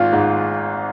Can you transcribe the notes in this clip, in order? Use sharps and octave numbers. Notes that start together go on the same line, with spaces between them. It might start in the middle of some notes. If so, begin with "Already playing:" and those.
Already playing: G#1 F4
G#2